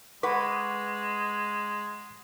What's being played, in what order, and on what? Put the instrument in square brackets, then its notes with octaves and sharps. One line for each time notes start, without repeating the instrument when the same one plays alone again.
[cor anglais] G#3 [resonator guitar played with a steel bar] B4 [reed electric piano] F#5 C#6 D6